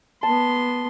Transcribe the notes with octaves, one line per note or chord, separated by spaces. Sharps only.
B3 A5 C6